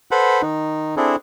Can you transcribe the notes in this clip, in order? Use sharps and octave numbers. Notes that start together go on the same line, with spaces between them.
A4 B4 C5 F#5 B5
D#3 D#4
C4 D4 E4 G#4 A4